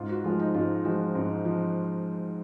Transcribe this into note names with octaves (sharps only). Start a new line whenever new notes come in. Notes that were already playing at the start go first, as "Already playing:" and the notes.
Already playing: G#2 F4
F#4
F3 G#3 F4
D#4
G#2 F4
F3 G#3 F#4
G#2
F3